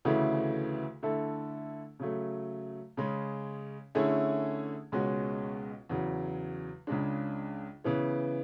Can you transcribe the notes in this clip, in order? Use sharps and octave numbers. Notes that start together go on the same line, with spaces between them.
D2 C#3 E3 A3 E4
D3 A3 E4 A4
C#3 F#3 A3
C#3 G#3 C#4
D3 A3 C#4 E4 G#4
C#2 B2 G#3 C#4 F#4
E2 C#3 F#3
C#2 C#3 G#3 D4
C#3 E3 B3